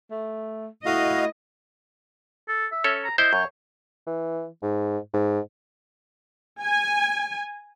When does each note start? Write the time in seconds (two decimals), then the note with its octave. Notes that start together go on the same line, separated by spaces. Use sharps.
0.11 A3
0.86 A3 E4 F#4 D#5 F5
2.49 A4
2.72 E5
2.84 C#4 A4 C#5
3.05 A#5
3.18 E4 C5 D#5 G6
3.33 F#2 C#5
4.07 E3
4.63 G#2
5.13 G#2
6.61 G#5